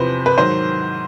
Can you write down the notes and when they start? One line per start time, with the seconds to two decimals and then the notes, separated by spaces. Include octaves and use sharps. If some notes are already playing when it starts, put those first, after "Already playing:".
Already playing: E2 C3 F3 B4 C5
0.26 B4
0.37 G#2 D#3 F#3 C5